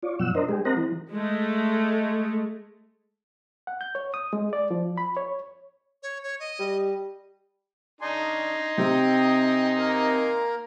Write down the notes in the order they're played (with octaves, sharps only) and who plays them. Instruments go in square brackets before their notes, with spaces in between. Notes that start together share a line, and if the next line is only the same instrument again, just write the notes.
[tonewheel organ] F4 C#5 D5
F#2 B2 F3 F#5 E6
D4 A#4 C5 D#5
G#3 G4 G#4
C4 A#4 C5 D#5 F#5 A#5
E3
[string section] G#3 A3
[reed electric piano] F#5
G6
C#5
D#6
G#3
D5
F3
B5
C#5
[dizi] C#5
C#5
D#5
[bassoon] G3
[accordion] C#3 D4 [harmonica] D#4 [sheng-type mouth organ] G#5 C6
[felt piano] C3 C4 G4 [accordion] G5 D#6
[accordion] A#3 A#4